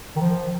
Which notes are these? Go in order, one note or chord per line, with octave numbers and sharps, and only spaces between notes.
D#3
F3